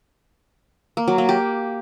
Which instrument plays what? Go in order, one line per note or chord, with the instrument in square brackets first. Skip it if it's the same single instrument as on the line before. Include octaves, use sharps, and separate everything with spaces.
[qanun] A#3
F#3
A#3
G4